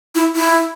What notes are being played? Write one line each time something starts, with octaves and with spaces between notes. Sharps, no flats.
E4
E4